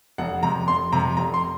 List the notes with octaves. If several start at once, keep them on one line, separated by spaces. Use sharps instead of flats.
F1 F#5
F2 C3 A#5
F1 C6
F2 C3 A#5
F1 A#5
C6